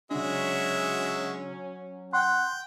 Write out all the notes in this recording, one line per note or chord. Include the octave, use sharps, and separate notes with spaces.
C#3 F#3 G#3 C#4 D4 F#4 E5
F#5 G5 C6